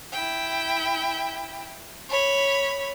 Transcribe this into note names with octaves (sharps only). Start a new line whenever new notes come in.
E4 G5
C#5 B5